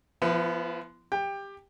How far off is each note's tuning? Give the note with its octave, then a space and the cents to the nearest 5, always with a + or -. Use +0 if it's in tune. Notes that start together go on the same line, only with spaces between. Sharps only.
F3 -20 B3 +0 E4 +30
G4 +15 G5 +20